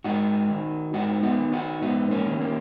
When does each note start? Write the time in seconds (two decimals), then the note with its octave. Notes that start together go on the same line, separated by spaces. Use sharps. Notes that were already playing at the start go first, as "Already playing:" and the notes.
0.04 G#2 D#4 F#4
0.50 D#3
0.93 G#2 D#4 F#4
1.23 B3 D#4
1.38 D#3
1.52 D#4 F#4
1.82 G#2 B3 D#4
2.11 A#3 C#4
2.26 D#3
2.41 A#3 C#4